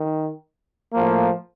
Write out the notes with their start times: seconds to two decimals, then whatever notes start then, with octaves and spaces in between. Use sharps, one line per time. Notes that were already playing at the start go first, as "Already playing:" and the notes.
Already playing: D#3
0.93 A2 F3 A#3